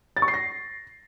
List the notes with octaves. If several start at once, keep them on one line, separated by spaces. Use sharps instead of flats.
A6
C#6
C7
A#6